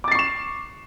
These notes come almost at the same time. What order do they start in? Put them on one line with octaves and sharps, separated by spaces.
D6 A6 C7 C#6 E7